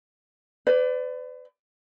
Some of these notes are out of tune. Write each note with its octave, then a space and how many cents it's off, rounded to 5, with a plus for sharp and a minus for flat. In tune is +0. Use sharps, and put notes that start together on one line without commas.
B4 +40 D5 +0